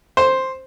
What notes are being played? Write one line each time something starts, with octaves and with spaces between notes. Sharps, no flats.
C5